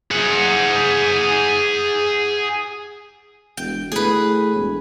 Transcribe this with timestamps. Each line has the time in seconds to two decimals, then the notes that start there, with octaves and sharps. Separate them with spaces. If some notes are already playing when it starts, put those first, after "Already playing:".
0.11 G#4 F#5
3.57 E1 G5
3.92 A2 G#4 B4
4.56 E1